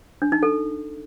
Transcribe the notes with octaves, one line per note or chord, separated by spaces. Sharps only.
D4
D#4
A4